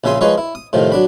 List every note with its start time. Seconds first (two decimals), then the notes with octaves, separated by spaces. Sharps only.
0.04 A#1 C#3 G#4 E5 C6 D#6
0.21 F3 G#3 D#4 G#4 B4 C#5
0.38 E4
0.55 D#6
0.73 A2 C3 D#3 F3
0.92 F#3 D4 B5